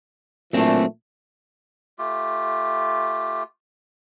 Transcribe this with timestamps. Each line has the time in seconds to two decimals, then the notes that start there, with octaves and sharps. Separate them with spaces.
0.53 A#2 E3 F#3 A3 C4 D4
1.98 A3 F4 G4